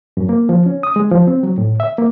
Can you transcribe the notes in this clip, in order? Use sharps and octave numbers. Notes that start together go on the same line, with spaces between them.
F#2
A#3
F3
C#4
D#6
G#3
F3
C4
F#3
A2
E5
A#3